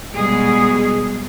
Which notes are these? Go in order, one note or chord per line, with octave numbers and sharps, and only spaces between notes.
B2 G3 G#3 G#4